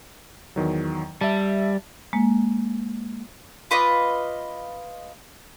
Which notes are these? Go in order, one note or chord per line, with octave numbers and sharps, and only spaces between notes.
E2 D#3 F#3
G3 E5 A5
G#3 A#3
F4 B4 D#5 D6